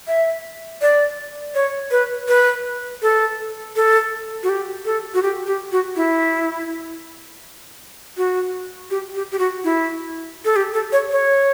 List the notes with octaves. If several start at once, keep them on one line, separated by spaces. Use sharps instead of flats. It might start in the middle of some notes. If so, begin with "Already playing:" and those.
E5
D5
C#5
B4
B4
A4
A4
F#4
G4
A4
F#4
G4
G4
F#4
E4
F#4
G4
G4
G4
F#4
E4
A4
G4
A4
C#5
C#5